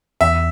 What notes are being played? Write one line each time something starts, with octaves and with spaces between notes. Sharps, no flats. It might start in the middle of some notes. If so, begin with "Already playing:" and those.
E2 E5